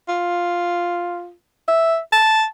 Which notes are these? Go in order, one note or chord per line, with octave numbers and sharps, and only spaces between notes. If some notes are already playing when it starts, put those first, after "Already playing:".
F4
E5
A5